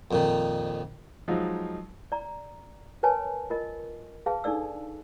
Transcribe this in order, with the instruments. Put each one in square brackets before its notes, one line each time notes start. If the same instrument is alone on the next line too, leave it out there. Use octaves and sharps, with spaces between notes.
[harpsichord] F2 A#2 D#3
[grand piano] F3 F#3 G#3 D#4 F4
[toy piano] D5 A#5
A#4 B4 C#5 G#5 A5
F4 A#4 D#5
G#4 B4 F5 A5
D4 D#4 A4 D5 E6